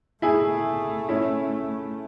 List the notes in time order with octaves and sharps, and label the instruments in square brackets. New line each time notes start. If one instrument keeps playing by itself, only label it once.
[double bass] A3 [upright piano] E4 G#4
[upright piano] C#4 E4